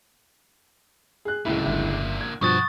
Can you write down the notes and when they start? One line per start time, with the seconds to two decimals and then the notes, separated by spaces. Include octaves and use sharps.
1.25 G#4 F#6
1.45 D1 C#2 A#2 D3 E4
1.66 G1 G2 E5
2.21 G#6
2.41 G2 B2 F3 G3 F#5 C#6 D#6 A6